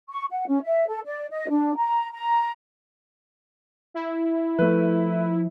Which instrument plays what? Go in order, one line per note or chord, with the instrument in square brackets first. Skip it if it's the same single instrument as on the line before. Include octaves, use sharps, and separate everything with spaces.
[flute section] C#6
F#5
C#4
E5
A4
D5
D#5
D4
A#5
A#5
[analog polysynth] E4
[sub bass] F3 [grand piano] A3 B4